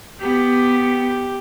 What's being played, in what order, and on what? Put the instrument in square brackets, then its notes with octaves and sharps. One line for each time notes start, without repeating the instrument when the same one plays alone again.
[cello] B3 [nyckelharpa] G4